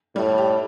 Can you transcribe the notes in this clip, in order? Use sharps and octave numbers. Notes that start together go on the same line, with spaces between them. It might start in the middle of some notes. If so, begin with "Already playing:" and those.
A2 G3
G4